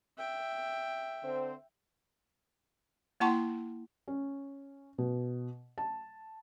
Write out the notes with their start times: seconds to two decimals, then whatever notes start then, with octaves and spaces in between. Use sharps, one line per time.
0.18 E5 G5
1.23 D3 C4 C5
3.20 A#3 E4 F#5 A5 C6 C#6
4.08 C#4
4.98 B2
5.78 A5